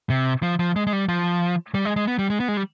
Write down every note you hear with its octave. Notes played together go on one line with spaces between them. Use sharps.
C3
F3
F3
G#3
G#3
G3
F3
G3
G#3
G#3
B3
G3
G#3
B3
G#3
G3